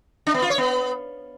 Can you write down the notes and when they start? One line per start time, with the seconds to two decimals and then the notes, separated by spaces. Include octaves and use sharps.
0.27 D4
0.34 B3
0.42 F4
0.50 C#5
0.58 B3